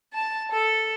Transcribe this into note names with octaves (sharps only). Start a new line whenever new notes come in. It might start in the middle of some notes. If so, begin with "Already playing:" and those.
A5
A4